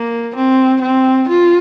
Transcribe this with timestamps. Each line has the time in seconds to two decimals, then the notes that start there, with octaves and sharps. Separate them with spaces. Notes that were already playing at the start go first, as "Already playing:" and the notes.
Already playing: A#3
0.36 C4
0.81 C4
1.29 F4